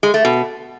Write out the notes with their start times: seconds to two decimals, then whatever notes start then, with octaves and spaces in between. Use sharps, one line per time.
0.03 G#3
0.14 A3
0.25 B2